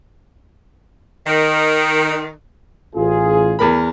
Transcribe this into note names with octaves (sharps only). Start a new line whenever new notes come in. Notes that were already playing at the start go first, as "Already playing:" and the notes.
D#3
A1 F4 G#4
E2 A#4 B5